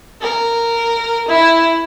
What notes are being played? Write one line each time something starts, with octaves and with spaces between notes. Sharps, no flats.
A#4
E4